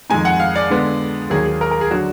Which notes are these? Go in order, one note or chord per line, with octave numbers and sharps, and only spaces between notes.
F2 D#3 G#3 D#4 G#5
F#5
F5
D5
D3 G#3 B3
D#2 D#3 F#3 A#3 G#4
G#4
A#4
A#4
G#4
D3 F#3 D4 F#4